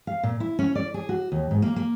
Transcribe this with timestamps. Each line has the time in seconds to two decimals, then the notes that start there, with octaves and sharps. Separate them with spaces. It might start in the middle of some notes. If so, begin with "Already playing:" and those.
0.07 F5
0.23 A#2
0.40 E4
0.59 C#4
0.75 D5
0.94 G#4
1.09 F#4
1.32 D#2
1.51 G#2
1.62 A#3
1.76 A#3